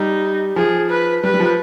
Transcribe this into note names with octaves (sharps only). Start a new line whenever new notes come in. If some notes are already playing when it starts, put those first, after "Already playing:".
Already playing: G3 D#4
F3 G#4
B4
G3 B4
G3
F3